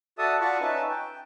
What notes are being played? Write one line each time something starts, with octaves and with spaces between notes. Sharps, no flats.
F#4 A4 D5 E5 A5 D#6
F4 D5 F#5 A5 B5 C#6
C#4 D#4 B4 E5 A5
G5